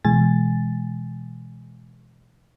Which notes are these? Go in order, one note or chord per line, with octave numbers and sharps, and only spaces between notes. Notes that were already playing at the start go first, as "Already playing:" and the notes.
B2 E3 G#3 G#5 A6